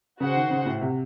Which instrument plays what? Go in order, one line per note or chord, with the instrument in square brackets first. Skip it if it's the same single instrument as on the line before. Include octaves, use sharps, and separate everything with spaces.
[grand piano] C#3 [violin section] F#4 C5 F#5
[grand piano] D#3
C#3
A2
C3